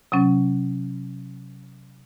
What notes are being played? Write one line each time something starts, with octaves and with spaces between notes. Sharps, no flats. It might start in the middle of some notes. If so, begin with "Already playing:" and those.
C3 F#3 C#4